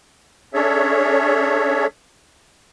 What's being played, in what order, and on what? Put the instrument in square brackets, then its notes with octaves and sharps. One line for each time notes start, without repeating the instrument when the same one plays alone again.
[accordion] C#4 D4 G#4 A4 C#5 E5